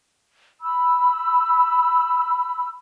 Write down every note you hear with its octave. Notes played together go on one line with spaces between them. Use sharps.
B5 E6